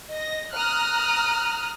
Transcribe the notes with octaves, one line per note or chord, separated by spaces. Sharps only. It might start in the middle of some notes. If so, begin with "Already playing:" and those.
D#5 A#6
A#5 D#6 F6 F#6